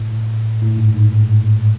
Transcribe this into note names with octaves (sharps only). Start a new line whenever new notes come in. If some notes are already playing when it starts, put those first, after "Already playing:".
Already playing: A2
A2
G#2
G#2